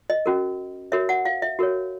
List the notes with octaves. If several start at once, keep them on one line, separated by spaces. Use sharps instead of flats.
D#5
C#4 F#4 A#4
F#4 A#4 C#5 E5
F#5
F5
E5
F#4 A#4 C#5